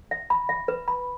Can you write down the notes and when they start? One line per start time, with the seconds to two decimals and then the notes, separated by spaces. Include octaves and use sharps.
0.11 E5
0.30 B5
0.49 E5
0.68 B4
0.88 B5